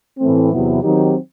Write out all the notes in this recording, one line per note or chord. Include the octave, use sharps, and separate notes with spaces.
A2 E3 A3 C4
E2 C3 F#3 B3 E4
D#3 F#3 C4 D#4 G4